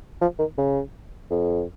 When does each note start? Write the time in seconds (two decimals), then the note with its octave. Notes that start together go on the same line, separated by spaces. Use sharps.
0.21 F3
0.39 D#3
0.58 C#3
1.30 F2